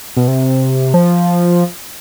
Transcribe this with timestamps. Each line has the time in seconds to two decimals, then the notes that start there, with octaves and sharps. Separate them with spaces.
0.17 B2
0.28 C3
0.94 F3